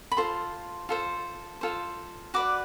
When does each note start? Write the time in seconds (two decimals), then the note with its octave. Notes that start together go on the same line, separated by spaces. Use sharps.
0.12 B5
0.17 F4 A4 C5 C6
0.89 F4 A4 C5
1.61 F4 A4 C5
2.34 F#4 B4 D5 D6